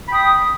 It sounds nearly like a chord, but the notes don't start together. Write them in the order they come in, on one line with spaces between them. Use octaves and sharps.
B5 G5 D#6